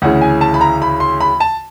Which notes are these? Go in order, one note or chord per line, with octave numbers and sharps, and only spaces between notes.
D2 C#3 E3 F#5
G#5
A5
B5
A#5
B5
C6
B5
A5